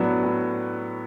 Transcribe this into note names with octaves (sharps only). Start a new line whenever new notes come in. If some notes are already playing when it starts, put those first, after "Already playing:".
Already playing: A2 F#3 B3 D4
A2